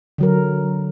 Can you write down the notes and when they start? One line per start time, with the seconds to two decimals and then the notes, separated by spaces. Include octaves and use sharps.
0.18 D3 F#3 A#4